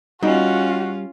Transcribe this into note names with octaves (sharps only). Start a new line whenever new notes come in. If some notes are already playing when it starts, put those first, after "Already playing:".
G3 C#4 D#4 F4 F#4